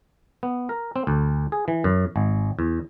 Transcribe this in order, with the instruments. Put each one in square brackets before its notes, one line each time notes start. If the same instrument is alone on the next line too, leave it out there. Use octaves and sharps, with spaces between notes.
[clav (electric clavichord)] B3
A#4
C4
D2
G#4
E3
F#2
G#1
E2